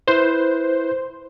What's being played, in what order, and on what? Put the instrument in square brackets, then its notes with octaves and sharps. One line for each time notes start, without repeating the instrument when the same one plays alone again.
[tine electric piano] E4 B4 [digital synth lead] C5